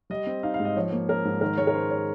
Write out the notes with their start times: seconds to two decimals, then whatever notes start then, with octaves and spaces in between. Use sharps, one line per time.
0.10 G3 D#5
0.27 C4
0.43 D#4 F5
0.54 F5
0.60 G#2
0.65 D#5
0.76 F3 C#5
0.92 A#3
1.08 C#4 A#4
1.25 G#2
1.41 D#3 A#4
1.58 G#3 C#5
1.67 A#4
1.74 C#4 C5
1.91 C#5